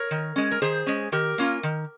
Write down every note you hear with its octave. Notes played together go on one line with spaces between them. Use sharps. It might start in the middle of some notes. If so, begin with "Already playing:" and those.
Already playing: A#4 C#5
D#3
G#3 C#4
A#4
D#3 G#4 C5
G#3 C#4
D#3 G4 A#4
A#3 C#4 F4
D#3